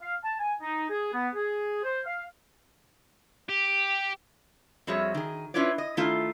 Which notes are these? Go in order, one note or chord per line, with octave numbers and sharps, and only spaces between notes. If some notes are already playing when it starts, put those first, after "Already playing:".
F5
A5
G#5
D#4
G#4
B3
G#4
C5
F5
G4
F2 G3 F#4 G#4 C#5 E5
D#3 G#4
C#4 E4 F4 B4 C#5 D5
D#5
D#3 A3 E4 F4